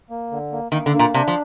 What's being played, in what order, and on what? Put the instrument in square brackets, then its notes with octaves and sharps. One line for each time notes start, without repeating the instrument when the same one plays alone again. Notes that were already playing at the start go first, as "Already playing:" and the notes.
[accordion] A#3
D3
A#3
[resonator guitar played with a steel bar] D#3 [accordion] A#3
[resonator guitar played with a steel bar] D3
[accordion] A#3
[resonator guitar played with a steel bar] A#2
[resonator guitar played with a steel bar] C3 [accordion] D4
[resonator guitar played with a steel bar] F3